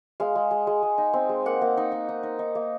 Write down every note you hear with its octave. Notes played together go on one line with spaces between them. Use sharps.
G#3 F5
G#3
G#3
G#3
G#3
D#4
C4
G#3
A#3 F#5
A#3
D#4
D#4
D#4
D#4
D#4
A#3